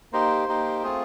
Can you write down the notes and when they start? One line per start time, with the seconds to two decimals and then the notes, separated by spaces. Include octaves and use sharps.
0.13 A#3 D#4 G4 C5
0.49 A#3 D#4 G4
0.83 A3 C4 F4 G#4